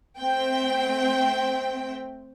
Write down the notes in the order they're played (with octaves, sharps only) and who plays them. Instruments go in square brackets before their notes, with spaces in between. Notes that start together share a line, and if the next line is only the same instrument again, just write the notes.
[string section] A3 C4 G5